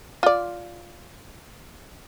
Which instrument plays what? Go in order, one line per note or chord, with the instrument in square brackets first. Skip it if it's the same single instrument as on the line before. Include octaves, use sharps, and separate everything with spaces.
[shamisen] F4 D5